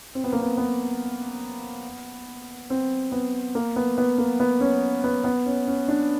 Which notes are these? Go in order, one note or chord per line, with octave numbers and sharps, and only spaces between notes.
C4
B3
A#3
B3
B3
C4
B3
A#3
B3
B3
A#3
B3
C#4
B3
B3
C#4
C#4
D4